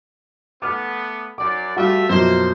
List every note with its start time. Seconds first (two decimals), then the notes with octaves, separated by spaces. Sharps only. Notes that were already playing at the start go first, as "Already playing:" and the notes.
0.62 A3 B3 D6 F6
1.38 F#2 D5 D6
1.77 G3 A3 F4 F#4 E5
2.09 F#2 B2 F3 A#3 C5